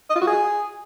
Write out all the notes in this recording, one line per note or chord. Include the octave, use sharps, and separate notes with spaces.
D#5
F4
F#4
G#4